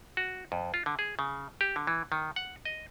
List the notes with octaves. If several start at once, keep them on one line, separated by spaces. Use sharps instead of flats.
F#4
F2
F4
D3
G#4
C#3
G4
D3
E3
D#3
F#5
D#5